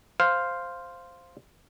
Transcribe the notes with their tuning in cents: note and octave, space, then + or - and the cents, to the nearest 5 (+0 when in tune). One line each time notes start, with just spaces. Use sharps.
C5 +0 F5 +0